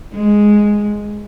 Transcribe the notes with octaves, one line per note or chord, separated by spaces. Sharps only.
G#3